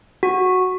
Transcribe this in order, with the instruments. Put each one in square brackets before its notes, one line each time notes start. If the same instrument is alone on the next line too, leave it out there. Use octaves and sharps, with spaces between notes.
[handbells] F#4